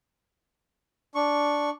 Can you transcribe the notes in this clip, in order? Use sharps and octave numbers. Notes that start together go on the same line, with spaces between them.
D4 C#6